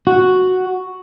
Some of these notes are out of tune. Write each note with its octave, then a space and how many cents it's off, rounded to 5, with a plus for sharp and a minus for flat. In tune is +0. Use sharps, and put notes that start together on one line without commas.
F#4 +0